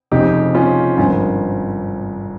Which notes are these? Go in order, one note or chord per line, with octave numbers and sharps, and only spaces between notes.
F1 F2 C#3 D#4 G4
C#4 F4
G#1 G2 F3 C#4 F4